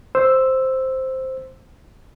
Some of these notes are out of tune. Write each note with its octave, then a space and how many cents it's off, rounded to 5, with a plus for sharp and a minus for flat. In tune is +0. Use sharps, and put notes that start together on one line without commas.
C5 +0 E6 +0